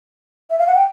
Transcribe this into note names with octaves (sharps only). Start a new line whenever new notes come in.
E5
F5
F#5
G5